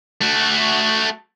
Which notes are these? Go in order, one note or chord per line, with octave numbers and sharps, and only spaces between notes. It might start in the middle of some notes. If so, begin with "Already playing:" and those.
A3 F#4